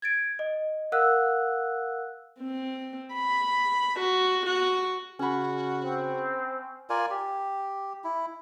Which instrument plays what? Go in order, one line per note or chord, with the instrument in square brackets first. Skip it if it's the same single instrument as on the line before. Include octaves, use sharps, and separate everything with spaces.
[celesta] G#6 A6 D7
D#5
A#4 F5 F#5 E6 F#6
[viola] C4
B5
F#4
F#4
[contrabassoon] C#3 [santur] C#4 B5 [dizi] F#4
[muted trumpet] C4
[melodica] F4 A#4 D5 G#5
G4
E4